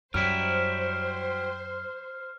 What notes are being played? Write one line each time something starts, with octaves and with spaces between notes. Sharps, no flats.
F#2 F#3 G3 E4 C5 F6